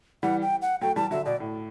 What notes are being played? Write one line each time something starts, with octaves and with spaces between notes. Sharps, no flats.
E3 G3 F#5
G5
F#5
F#3 A3 G5
E3 G3 A5
D3 F#3 E5
B2 D5
A2